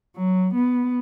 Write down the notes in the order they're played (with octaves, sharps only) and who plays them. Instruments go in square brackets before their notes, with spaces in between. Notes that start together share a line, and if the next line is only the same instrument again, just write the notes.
[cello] F#3
B3